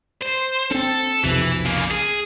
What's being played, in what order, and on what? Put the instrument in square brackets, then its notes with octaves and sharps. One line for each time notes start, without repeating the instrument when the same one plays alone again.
[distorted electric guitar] C5
[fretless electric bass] C4 C#4 [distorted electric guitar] A4
[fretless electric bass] B1 F2 C3 [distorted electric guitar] E3
[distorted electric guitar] C#3 A#3
G#4